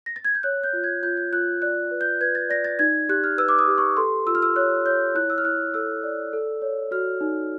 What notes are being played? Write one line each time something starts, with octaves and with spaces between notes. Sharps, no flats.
A#6
A6
G#6
G6
C#5 F#6
G6
F4
G#6
F4 G6
G6
F4 F#6
D5 F#6
B4
G6
B4 G#6
A6
D5 A#6
A6
D#4 G#6
G4 F#6
F6
B4 E6
D6
D#6
G4
C#6
A4 C6
F4 E6
F6
E6
C#5 F#6
C#5 G6
E4 F#6
E6
F6
E4 F#6
A4 E6
D5
A4
C#5
F#4 F6
D#4